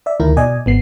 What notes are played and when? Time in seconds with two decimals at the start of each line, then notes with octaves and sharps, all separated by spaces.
0.06 D5 E5
0.20 D2 D#3 E4 A#4
0.37 B2 D5 D#5 G#5
0.66 G#1 B3 C7